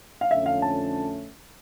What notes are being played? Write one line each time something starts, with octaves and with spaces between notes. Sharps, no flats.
F5
F2 D3 A3 C#4 E5
F5
A5